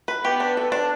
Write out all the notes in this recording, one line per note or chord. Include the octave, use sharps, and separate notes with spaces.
B4
B3 G4
D4
A4
D4